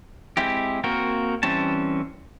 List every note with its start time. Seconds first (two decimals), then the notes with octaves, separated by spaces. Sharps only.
0.37 G#3 C4 E4 G4
0.84 A#3 C4 F#4 A#4
1.43 E3 G3 C4 C#4 A5